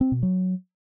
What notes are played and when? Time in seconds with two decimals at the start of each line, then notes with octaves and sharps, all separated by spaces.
0.01 C4
0.12 B2
0.23 F#3